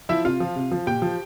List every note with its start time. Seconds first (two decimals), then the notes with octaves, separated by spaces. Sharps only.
0.09 F3 E4 E5
0.24 C3 F4 F5
0.40 F3
0.56 C3
0.71 F3
0.87 A#2 G4 G5
1.02 F3